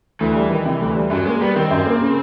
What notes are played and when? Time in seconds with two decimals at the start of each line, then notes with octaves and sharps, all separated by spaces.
0.21 D2 E3
0.35 G3
0.50 D#3
0.65 C3
0.81 D2
0.96 G3
1.10 F#2 F#3
1.26 G#3 A#3
1.41 G3 B3
1.56 D#3 C4
1.71 F#2
1.86 A#3
2.01 C#3